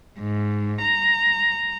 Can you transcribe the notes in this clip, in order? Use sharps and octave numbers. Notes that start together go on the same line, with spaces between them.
G#2
A#5